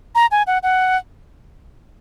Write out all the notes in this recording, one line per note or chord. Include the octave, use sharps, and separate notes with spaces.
A#5
G#5
F#5
F#5